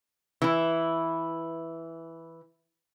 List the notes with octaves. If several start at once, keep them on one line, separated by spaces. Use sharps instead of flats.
E3 E4